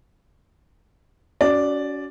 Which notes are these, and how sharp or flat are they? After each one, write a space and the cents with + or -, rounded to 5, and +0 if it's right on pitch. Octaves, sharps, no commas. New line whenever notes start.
C#4 +35 F#4 +15 D5 +0